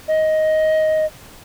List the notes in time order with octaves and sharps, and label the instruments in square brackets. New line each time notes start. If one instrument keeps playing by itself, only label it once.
[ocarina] D#5